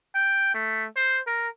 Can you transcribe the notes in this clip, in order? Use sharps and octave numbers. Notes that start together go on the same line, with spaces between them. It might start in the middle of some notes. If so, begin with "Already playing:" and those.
G5
A3
C5
A#4